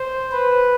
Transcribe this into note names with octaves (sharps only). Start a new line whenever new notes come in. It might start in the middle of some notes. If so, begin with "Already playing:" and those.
Already playing: C5
B4